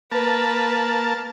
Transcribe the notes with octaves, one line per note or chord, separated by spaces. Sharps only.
A#3 B4 A5